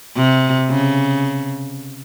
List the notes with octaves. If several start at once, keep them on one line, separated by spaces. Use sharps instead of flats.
C3
C#3